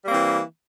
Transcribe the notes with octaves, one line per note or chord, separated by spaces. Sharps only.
E3 G3 A#3 C4